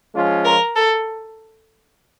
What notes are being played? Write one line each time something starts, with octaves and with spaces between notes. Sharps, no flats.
F3 G#3 C#4 F4
A#4
A4